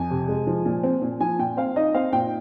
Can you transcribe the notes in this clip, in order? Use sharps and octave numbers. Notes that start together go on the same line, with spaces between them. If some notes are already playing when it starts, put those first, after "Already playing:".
Already playing: F2 G#5
C3
G#3
F3
A#2
C4
A#2
F3 G#5
A#2 G5
C4 F5
D#4 D#5
C4 F5
A#2 G5